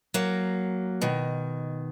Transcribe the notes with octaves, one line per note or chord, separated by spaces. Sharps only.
F#3 A#3
B2 D#3